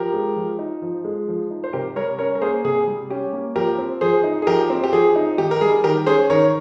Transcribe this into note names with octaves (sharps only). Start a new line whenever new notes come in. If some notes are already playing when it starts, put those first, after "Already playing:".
Already playing: F3 G4 A#4
G#3
F3
D#4
F3
G#3
F3
D#4
C5
C3 G4 A#4
G3 A#4 C#5
C#4 A#4 C#5
A#4
A#3 G#4 C5
C3 G#4
G3
C#4 G4
A#3
F3 G4 A#4
C4
F3 G#4 C5
D#4
G#4
F3 G4 A#4
C4
G4
F3 G#4
D#4
D#3 G4
A#4
G3 G#4
D#3 G4 A#4
C#4 G#4 C5
D#3 A#4 C#5